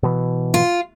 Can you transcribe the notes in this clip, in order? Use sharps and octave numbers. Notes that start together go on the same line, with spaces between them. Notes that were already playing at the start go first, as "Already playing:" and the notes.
B2 E3
F4